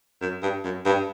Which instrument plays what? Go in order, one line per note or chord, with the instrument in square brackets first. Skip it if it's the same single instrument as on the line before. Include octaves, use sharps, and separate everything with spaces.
[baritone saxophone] F#2
G2
F#2
G2